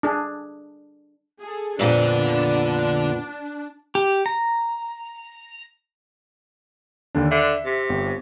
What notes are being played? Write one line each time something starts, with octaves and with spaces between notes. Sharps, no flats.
D4 G#4
G#4 A4
F2 A#2 D3 B3 D4 D5
G4
A#5
D#2 D3 D4
D3 E5
C3
G1 C4